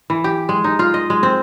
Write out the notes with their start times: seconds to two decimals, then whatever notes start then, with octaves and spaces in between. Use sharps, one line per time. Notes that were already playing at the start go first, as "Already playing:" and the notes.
0.10 E3
0.24 G4
0.49 G#3
0.64 D#4
0.79 F4
0.94 D#5
1.10 G#3
1.23 C4